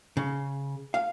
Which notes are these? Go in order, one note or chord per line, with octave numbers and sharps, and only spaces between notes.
C#3
F5